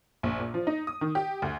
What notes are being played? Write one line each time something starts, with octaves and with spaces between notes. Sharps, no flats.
A#1
A#2
F3
D#4
D#6
D#3
G4
D2